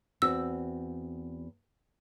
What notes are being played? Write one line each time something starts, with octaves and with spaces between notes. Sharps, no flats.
E2 C4 F#4 E6